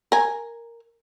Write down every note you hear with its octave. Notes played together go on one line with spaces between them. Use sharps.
A#4 G#5